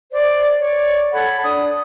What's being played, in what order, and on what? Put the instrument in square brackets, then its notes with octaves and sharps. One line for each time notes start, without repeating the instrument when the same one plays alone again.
[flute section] C5 D5
C#5 D5
A4 F#5 B5 G#6
D4 D#6